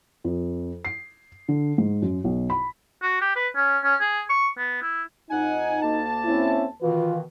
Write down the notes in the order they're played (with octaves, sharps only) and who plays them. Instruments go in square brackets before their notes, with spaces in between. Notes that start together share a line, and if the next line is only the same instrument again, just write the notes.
[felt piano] F2
C7
D3
G#2
F#2
B1
B5
[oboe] F#4
G4
B4
C#4
C#4
G#4
C#6
B3
E4
[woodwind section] F2 F#5 G#5 [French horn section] D#4
[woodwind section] D2 A#3 A5
[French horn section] C4 C#4 E4
[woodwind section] B2 D#3 E3 [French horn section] F4 B4